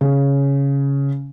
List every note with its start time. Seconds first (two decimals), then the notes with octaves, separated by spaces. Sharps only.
0.01 C#3